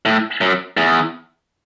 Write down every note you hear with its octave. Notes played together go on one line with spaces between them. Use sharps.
A2
F#2
E2